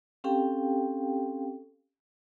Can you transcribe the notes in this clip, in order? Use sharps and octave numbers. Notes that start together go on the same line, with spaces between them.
C4 C#4 G4 A4 F5 G5